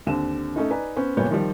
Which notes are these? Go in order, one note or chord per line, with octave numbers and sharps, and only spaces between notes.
D#2 D3 C4 E7
A3 C#4 D#4
D#4 B4 D5 G#5 A#5
B3 C#4 C5
F#1 A#2 G3 B3 C#5 G6
D#3 F3 G3